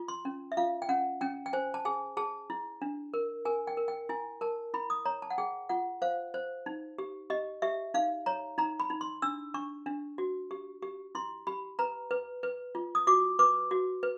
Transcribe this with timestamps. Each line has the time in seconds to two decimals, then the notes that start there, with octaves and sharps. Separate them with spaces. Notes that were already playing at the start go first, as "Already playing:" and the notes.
Already playing: F4
0.08 C6
0.25 C#4
0.52 E5
0.57 F4 F5
0.82 G5
0.89 C#4 F#5
1.21 C#4 G5
1.46 G5
1.53 C5 G#5
1.74 A5
1.85 G#4 G#5
2.17 G#4 A5
2.50 E4
2.82 D4
3.14 A#4
3.45 A#4 G#5
3.67 G5
3.77 A#4
3.88 G5
4.09 E4 G#5
4.41 A#4 A5
4.74 E4 B5
4.90 D#6
5.05 C#5 A#5
5.22 A5
5.30 F#5
5.38 G#4 G5
5.69 F4 F#5
6.02 C5 F5
6.34 C5
6.66 D#4
6.98 G4
7.30 G4 D#5
7.62 G4 E5
7.94 D#4 F5
8.26 C#5 A#5
8.58 D#4 A#5
8.80 B5
8.90 D#4
9.01 C6
9.22 D4 E6
9.54 D4 C#6
9.86 D4
10.18 F#4
10.51 G4
10.82 G4
11.15 E4 C6
11.47 G4 B5
11.79 B4 A#5
12.11 B4
12.43 B4
12.75 F4
12.95 D#6
13.07 F#4 D6
13.39 B4 D6
13.71 F#4
14.03 B4